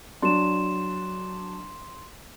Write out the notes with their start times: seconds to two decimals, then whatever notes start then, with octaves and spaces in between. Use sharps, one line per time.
0.22 F#3 D4 C6 E7